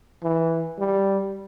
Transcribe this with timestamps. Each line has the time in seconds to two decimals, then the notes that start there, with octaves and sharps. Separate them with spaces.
0.23 E3
0.78 G3